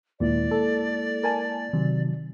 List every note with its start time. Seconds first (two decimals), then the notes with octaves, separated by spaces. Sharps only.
0.20 D#2 A#2 G#3 A#3 E4 D5
0.51 A4
1.23 A#4 G#5 A5
1.73 C3 D#3 F#3